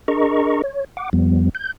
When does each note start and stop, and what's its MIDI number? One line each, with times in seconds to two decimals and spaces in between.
0.08 0.62 62
0.08 0.62 68
0.08 0.62 70
0.08 0.62 75
0.08 0.62 82
0.08 0.62 85
0.63 0.84 73
0.97 1.10 78
0.97 1.10 86
1.13 1.49 41
1.13 1.49 53
1.13 1.49 55
1.13 1.49 59
1.55 1.72 91